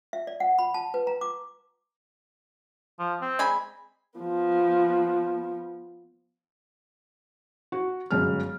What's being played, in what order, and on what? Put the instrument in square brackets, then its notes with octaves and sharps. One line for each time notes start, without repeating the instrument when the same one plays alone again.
[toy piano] E5
D5
F#5
B5
A5
B4
A#5
D6
[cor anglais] F3
C4
[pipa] G#3 G#5 B5
[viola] F3 B3
[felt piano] F#4
G1 F#2 G#3 F6